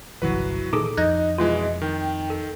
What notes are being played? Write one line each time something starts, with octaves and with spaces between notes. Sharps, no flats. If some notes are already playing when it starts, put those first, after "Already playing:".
G1 C2 E3 F#3 F#4 B4
A#2 D#3 D#4 G#4 A4 D6
F2 D#4 D#5 F#6 G#6 A#6
B2 E3 G#3 F4
D#3 G5
A4